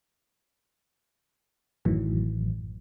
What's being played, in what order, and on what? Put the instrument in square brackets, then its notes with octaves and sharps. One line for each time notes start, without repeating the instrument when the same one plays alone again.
[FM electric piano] A1 F#2 A2 D#3 E3 F#3